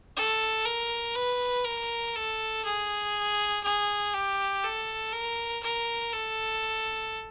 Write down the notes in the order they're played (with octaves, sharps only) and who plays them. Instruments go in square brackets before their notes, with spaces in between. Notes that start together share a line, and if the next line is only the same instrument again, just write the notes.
[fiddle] A4
A#4
B4
A#4
A4
G#4
G#4
G4
A4
A#4
A#4
A4